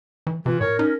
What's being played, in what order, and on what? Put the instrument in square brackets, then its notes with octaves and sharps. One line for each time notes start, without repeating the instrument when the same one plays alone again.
[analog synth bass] E3
[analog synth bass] C3 [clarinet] E3 [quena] F4
[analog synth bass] A2 [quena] A#4 [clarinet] C#5
[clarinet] C#4 [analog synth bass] D#4